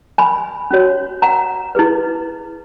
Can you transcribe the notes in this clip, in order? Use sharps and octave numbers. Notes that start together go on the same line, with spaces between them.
G#5 B5
C#4 F#4 C#5
F#5 A#5
E4 G#4 B4